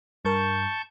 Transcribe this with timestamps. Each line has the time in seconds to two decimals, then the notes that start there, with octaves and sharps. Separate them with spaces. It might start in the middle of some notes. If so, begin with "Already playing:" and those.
0.25 G2 A#4 A5 C#6 G6